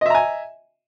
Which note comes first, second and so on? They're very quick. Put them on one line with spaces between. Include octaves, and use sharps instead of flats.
D#5 E5 A#5 G#5